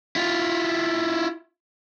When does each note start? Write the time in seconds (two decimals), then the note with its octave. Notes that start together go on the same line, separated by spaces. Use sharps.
0.16 E4 F4